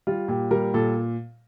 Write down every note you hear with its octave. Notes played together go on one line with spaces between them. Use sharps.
G3 F4
A#2 G4
G3 A#4
A#2 A4